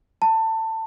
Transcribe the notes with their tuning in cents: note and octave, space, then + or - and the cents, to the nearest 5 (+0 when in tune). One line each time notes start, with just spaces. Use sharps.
A5 +25